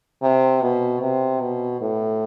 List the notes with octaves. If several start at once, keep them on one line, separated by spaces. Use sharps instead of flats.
C3
B2
C3
B2
A2